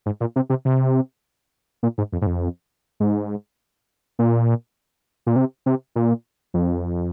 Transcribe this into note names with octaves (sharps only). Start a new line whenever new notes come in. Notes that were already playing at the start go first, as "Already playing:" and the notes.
G#2
A#2
C3
C3
C3
A#2
G#2
F2
G#2
F2
G#2
A#2
A#2
C3
C3
A#2
F2